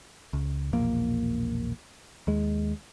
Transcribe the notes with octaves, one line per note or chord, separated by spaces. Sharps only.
C#2
E1 A#1 A#3
D#2 G#3